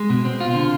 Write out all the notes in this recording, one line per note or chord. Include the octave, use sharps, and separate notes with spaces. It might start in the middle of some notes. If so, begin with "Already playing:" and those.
Already playing: G#3
B2
C4
F4
D3